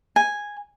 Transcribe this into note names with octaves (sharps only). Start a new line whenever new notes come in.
G#5